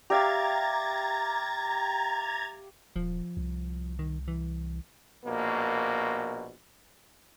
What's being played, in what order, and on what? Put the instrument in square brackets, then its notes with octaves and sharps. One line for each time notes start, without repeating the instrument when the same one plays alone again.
[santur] G4 E5 F5 [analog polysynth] A#5 G#6 A6
[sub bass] D#1 [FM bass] F3
[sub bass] C2
[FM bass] D#3
E3
[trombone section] A#1 B2 A#3